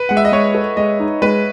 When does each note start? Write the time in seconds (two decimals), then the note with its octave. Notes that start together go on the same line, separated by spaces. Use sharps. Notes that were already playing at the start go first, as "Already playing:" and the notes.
Already playing: B4
0.09 G#3 F#5
0.17 E5
0.25 D#5
0.32 G#3 C#5
0.55 A4
0.77 G#3 D#5
1.00 D#4
1.22 G#3 B4